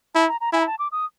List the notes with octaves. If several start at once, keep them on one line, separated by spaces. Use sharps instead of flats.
E4 A5
A#5
A#5
E4 G#5
A#5
A5
D6
D#6